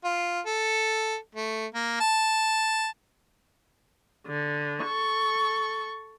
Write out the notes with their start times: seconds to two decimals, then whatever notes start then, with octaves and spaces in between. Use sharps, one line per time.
0.04 F4
0.46 A4
1.35 A3
1.74 A#3
2.00 A5
4.27 D3
4.83 A4 C#6